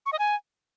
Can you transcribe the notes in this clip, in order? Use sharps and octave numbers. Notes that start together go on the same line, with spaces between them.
C#6
D#5
G#5